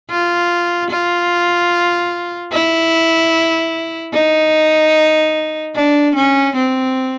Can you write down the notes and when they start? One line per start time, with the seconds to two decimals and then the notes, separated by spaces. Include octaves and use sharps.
0.11 F4
0.90 F4
2.52 E4
4.13 D#4
5.75 D4
6.16 C#4
6.56 C4